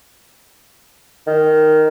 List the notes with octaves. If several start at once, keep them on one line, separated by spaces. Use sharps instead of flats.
D#3